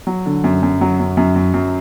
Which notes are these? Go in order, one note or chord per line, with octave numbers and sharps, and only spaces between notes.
F#3
D3
F#2
F#2
F#3
F#2
F#2
F#2
F#2